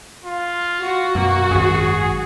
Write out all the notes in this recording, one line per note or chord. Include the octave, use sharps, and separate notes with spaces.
F4
F#4
F#2 B2 A#3
G#1 F#2 G#4